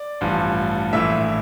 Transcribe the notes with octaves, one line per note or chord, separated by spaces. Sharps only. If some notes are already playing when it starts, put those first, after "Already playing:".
Already playing: D5
A1 G2 F3
A#1 A2 E3 E5